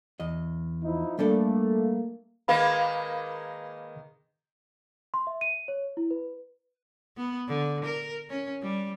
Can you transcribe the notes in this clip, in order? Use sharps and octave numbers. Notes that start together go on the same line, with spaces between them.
E2 D#5
F3 D#4 E4
G3 A3 A#3 D4 A4
D#3 G#3 A#3 B4 F5 B5
C6
E5
D#7
C#5
E4
B4
B3
D3
A#4
C#4
G3